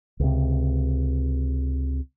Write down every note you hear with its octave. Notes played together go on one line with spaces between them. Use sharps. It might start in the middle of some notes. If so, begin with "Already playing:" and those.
C#2 C3